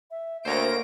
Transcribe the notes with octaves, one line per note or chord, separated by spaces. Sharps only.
E5
D2 A#3 C5 C#5 F5 A#6 D7